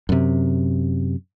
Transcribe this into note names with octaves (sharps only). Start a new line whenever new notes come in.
F#2 C3